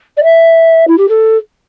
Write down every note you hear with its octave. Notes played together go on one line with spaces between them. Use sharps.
D5
E5
E4
G4
A4